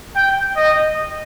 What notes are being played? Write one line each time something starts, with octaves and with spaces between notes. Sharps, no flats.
G5
D#5